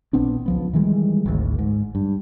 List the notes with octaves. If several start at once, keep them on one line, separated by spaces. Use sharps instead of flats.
A#1 B3 C4 D4
C#2 F3 B3
D#3 E3 G3 G#3
G#1 D2
G#2
G2